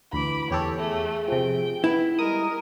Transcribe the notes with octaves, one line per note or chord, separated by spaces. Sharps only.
D2 E3 B5 D6
E2 G4 A4 C#5
A3 G#4
C3 F3 G5
B3 E4
G3 G#3 A#4 D#6